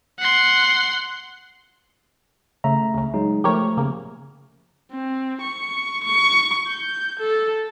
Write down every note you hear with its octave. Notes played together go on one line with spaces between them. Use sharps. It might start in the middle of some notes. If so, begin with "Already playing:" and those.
F#5 C6
C#3 A3 E5 A#5
C#2 C#3
F#3 G#3 D#4
F3 A3 G4 A#4 C#5
C#3 A#3
C4
C#6
C#6
G6
A4